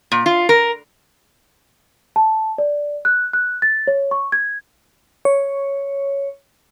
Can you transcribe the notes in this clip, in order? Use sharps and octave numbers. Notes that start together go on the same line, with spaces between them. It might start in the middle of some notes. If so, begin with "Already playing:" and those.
A#2
F4
A#4
A5
D5
F#6
F#6
A6
C#5
C#6
G#6
C#5